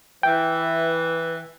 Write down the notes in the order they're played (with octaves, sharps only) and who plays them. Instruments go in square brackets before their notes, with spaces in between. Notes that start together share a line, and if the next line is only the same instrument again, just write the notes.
[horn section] E3 [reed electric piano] G5